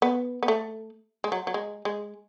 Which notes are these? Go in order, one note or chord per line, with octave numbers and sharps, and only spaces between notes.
B3
B3
A3
G#3
F#3
F#3
G#3
G#3